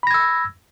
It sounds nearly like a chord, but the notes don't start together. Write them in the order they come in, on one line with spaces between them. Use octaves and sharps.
B5 A#6 G#6 E6